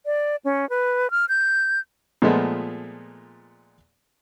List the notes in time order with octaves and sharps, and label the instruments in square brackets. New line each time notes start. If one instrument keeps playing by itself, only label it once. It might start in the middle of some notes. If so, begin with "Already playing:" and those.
[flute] D5
C#4
B4
F6
G6
[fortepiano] A#2 F3 G#3 A3 B3